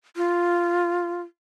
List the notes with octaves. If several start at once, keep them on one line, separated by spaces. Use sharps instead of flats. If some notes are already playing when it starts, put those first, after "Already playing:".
F4